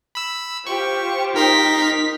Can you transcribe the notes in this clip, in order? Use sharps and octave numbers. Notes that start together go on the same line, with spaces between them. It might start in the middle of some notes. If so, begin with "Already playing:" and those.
B5 E6
F4 G4 C5 C#6
D#4 A#4 A#5 C6 B6